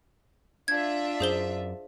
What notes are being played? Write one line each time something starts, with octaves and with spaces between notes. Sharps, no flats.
D4 F4 E5 G#6
F#2 G#4 C5 G7